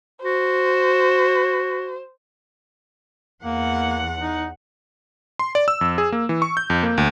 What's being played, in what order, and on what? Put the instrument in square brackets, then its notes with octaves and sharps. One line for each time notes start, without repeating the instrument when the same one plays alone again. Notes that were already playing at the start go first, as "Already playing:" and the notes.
[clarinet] F#4 [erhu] C5
[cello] E2 F#5 [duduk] A#3
[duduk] D#4
[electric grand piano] C6
D5
E6
F2
G#4
A#3
E3
C#6
G6
F2
A#3
D2